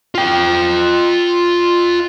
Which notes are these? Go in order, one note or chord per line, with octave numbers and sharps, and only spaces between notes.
F4 G5